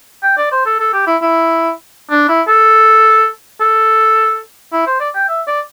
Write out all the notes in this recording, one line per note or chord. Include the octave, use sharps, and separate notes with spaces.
G5
D5
C5
A4
A4
G4
E4
E4
D4
E4
A4
A4
E4
C5
D5
G5
E5
D5